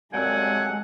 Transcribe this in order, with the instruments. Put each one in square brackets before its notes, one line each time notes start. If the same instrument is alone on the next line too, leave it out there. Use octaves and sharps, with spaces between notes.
[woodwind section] F#2 A#2 C4 [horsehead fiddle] G#3 [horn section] G4 A4 F#5 [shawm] G#5